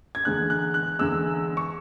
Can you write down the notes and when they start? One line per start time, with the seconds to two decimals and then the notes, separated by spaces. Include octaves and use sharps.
0.15 G#6
0.25 E2 D3 G#3 F#6
0.50 F#6
0.74 F#6
0.99 E2 D3 G#3 E6
1.57 C#6